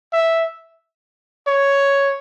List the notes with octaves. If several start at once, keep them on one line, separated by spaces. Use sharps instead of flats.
E5
C#5